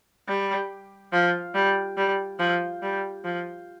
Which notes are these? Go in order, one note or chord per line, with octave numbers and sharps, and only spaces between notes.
G3
F3
G3
G3
F3
G3
F3